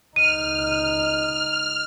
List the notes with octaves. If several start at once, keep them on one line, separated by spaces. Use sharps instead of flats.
C#2 D#4 F6 D#7